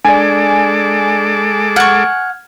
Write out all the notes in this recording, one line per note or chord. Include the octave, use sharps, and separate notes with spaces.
G#3 D4 A4 D5 G#5 D6
F#5 C#6 F6 G#6